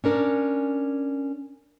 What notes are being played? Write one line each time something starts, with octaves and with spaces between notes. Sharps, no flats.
C#4 D4 A#4 D5